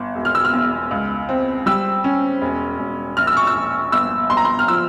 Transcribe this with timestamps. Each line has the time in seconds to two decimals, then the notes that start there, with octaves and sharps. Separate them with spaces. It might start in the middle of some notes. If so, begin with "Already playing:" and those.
Already playing: G1
0.15 E1
0.25 F6
0.35 E6
0.45 F6
0.53 E2
0.91 C#2
1.29 C4
1.66 G3 E6
2.04 C#4
2.41 E1
2.79 E1
3.17 A#1 F6
3.27 E6
3.37 C#6
3.47 E6
3.55 A#1
3.92 G1 E6
4.30 G1 C6
4.37 A#5
4.45 C6
4.59 F6
4.68 F3 E6